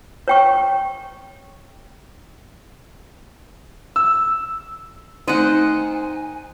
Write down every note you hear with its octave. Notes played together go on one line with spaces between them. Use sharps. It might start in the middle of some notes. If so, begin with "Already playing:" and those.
C#5 G5 C#6
E6
D#3 A3 C4 D#4 C5 D#5 F#5 G#5